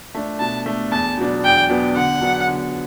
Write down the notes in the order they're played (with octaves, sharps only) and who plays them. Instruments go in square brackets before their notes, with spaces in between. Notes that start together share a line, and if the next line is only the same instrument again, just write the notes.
[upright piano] A3 D4
[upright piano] B2 [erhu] A5
[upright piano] A3 D4
[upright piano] E2 [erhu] A5
[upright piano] B2 F#3 B3 D4
[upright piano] E2 [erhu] G5
[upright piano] B2 F#3 B3 D4
[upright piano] D3 [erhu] F#5
[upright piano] F#3 B3 D4
D3